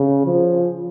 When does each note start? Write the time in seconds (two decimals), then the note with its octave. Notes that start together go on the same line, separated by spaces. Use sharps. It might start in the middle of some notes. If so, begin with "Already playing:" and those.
Already playing: C#3
0.26 F3